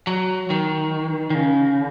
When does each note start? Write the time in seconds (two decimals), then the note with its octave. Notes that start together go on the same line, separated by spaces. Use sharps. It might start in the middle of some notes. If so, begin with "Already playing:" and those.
0.07 F#3
0.50 D#3
1.30 D#3
1.35 C#3